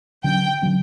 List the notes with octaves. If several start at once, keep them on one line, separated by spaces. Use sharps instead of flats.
D3 F#3 C#4 G5
D3 F#3 C#4